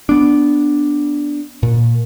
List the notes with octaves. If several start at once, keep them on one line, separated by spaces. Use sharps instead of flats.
B3 D4
A#2